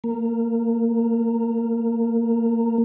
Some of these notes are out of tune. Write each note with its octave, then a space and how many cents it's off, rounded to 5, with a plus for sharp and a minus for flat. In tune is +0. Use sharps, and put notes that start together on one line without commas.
A#3 -20